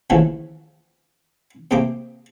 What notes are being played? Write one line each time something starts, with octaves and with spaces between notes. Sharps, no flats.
D#2 C#3 E3 F3 A3
C3 A3 A#3 G4 D6